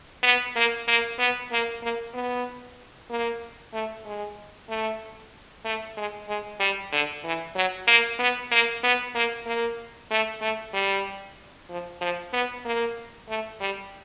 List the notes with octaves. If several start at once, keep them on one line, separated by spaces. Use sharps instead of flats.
B3
A#3
A#3
B3
A#3
A#3
B3
A#3
A3
G#3
A3
A3
G#3
G#3
G3
D3
E3
F#3
A#3
B3
A#3
B3
A#3
A#3
A3
A3
G3
F3
F3
B3
A#3
A3
G3